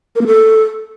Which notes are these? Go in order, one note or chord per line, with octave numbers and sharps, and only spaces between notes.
A#4
A#3
A4